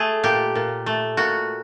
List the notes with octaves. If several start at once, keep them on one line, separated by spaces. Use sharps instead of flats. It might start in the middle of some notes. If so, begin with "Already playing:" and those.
Already playing: A3 G#4
A#2 G4
A#2
A3
A#2 F#4